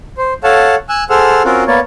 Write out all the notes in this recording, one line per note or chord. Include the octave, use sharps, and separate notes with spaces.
C5
A4 C#5 F5 F#5 A5
G#5 E6 F#6
G#4 A4 C5 F#5 E6 F6
C4 C#4 F4 F#4 A#4
A#3 B3 C#5 D5